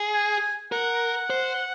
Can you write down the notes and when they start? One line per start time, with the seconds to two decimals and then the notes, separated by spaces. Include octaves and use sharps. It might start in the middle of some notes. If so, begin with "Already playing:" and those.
Already playing: G#4
0.14 G#5
0.72 A#4 F#5
1.30 C5